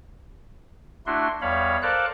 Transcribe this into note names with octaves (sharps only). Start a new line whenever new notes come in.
A3 D4 E4 F#4 C6
E2 G3 C#5 F5 B5
A4 A#4 C5 D5 F5 F#6